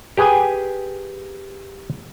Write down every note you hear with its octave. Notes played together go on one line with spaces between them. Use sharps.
G4 G#4 B4 G5 G#5